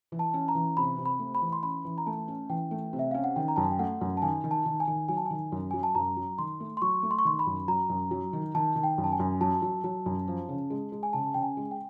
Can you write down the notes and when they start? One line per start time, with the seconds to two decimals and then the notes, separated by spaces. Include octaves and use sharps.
0.12 E3
0.19 A5
0.34 C#4
0.48 A#5
0.55 E3
0.77 C3 B5
0.98 C3
1.06 B5
1.19 A3
1.35 B5
1.41 E3
1.53 C6
1.63 C#4 B5
1.85 E3
1.98 A#5
2.06 A3 A5
2.28 C#4
2.50 E3 G5
2.71 A3
2.93 C3
2.99 E5
3.11 C#4 F5
3.24 F#5
3.36 D#3 G5
3.48 A#5
3.56 F#2 A5
3.63 G#5
3.72 G5
3.79 A3 F#5
4.01 F#2
4.17 A5
4.22 D#3 G#5
4.44 D#3
4.51 A5
4.66 D#3
4.80 G#5
4.87 D#3
5.08 F#3 G#5
5.17 A5
5.26 D#3 G#5
5.52 F#2
5.71 F#3 G#5
5.83 A5
5.95 F#2 A#5
6.17 F#3
6.38 D#3 C6
6.60 A3
6.77 C6
6.82 F#3 C#6
7.03 A3
7.11 C6
7.19 C#6
7.25 D#3 C6
7.39 B5
7.47 F#2
7.68 F#3 A#5
7.90 F#2
8.11 F#3
8.33 D#3
8.55 D#3 A5
8.76 D#3
8.83 G5
8.98 F#2
9.04 A5
9.12 G#5
9.19 F#2
9.41 F#3 A5
9.62 F#3
9.84 F#3
10.06 F#2
10.27 F3
10.49 C#3
10.70 G#3
10.92 G#3
11.03 G#5
11.13 C#3 A5
11.34 C#3 G5
11.43 G#5
11.57 G#3
11.71 G5